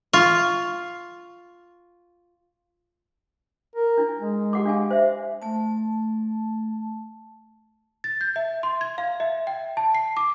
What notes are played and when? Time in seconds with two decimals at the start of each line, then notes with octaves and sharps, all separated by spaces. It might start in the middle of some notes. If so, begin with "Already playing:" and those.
0.13 F4 C#6
3.76 A#4
3.98 D4 E4
4.20 G#3
4.53 G4 F#5 D6
4.65 D4 F5 G#5
4.91 C5 E5
5.42 A3 A5
8.04 A6
8.21 G6
8.36 E5
8.63 C6
8.81 G#6
8.98 F5
9.20 E5
9.47 G5
9.77 A5
9.95 C7
10.17 D6